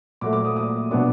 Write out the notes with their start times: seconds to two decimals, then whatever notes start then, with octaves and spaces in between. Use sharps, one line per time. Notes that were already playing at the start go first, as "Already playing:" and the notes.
0.21 A#2 F#3 A3 D6
0.33 D6
0.45 D#6
0.56 D#6
0.91 B2 F#3 B3 D4 D6